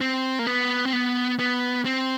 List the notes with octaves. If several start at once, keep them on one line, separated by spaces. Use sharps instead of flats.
C4
A#3
B3
C4
B3
B3
C4